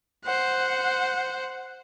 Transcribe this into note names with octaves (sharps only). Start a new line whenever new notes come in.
C5 F#5